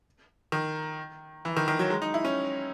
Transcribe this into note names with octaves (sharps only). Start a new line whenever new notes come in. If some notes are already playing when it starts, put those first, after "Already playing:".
D#3
E3
D#3
D#3
F#3
G#3
D#4
E4
C#4